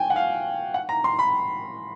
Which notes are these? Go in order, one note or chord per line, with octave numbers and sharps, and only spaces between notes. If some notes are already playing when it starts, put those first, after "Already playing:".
Already playing: G5 G#5
F#5
F5
F#5
A#5
C6
B5